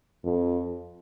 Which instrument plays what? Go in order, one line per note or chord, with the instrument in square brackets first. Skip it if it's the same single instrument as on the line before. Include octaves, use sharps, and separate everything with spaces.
[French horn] F2